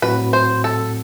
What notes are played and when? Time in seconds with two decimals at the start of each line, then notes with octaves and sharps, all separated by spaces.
0.02 A2 F#3 C4 F#4 B4
0.33 C5
0.64 A4